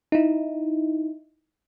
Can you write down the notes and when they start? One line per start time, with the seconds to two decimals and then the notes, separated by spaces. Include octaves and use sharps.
0.12 D#4 E4